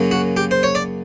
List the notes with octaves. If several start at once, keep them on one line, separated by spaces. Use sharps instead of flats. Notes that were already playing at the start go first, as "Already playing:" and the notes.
Already playing: F#2 C#3 F#3 A#3 C#4
F#4
G4
C5
C#5
D5